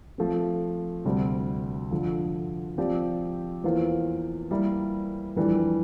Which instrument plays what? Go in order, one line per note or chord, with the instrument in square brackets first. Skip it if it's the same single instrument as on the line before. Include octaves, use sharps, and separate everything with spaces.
[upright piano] F3 A3 C4
D2 C3 G3 C4
F2 D3 F3
F3 C4 G4 D5
E2 E3 A#3 F4 C5
G3 A#3 E4 A#4
F2 E3 G3 D4